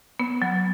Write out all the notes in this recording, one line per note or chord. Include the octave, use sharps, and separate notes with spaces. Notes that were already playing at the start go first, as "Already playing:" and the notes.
B3
F#3